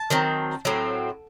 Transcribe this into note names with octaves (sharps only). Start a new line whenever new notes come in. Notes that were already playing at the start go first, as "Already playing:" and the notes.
Already playing: A5
D#3 F#3 C4
A2 F#3 C4